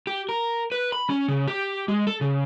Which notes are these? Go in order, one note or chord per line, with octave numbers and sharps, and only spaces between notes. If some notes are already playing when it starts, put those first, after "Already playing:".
G4
A#4
B4
B5
C#4
C#3
G4
G#3
A4
C#3